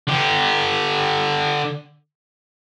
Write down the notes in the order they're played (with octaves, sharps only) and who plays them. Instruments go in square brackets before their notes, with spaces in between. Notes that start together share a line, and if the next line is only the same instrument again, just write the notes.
[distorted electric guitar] D3 G4